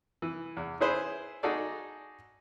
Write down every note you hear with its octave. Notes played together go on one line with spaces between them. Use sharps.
E3
E2
C#4 E4 G#4 B4 C5
D#4 F#4 G#4 A4 D5